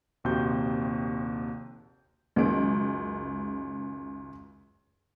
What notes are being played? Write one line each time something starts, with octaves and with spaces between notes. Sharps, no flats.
A#1 D#2 C3 F#4 C6 G6
C#2 F#2 D#3 G#3 D7